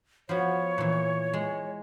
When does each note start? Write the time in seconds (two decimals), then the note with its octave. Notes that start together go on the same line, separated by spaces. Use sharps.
0.29 F3 B3 F#4 C#5
0.78 A#2 E3
1.33 G#3